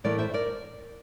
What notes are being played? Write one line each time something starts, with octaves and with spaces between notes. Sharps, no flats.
A2 E3 A3 E4 A#4 D5
C5 E5
A#4 D5